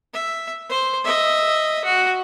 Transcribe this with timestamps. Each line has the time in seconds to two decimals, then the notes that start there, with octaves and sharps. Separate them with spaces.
0.13 E5
0.70 C5
1.04 D#5 E5
1.85 F#4